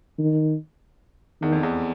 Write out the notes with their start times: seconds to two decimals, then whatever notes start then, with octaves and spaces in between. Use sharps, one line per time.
0.19 D#3
1.41 E2 D#3
1.52 F2
1.63 E2